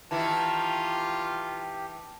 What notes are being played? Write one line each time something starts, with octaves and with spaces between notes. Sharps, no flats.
D#3 E3 E4 F4 G4 A5